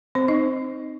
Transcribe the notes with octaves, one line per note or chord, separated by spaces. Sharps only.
C4 C5
D#4 D#5